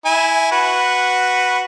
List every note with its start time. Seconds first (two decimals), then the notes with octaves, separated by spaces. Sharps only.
0.05 E4 G#5
0.51 F#4 B4